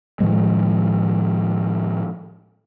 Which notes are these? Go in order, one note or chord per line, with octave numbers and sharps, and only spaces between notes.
A2 D#3 F3 G#3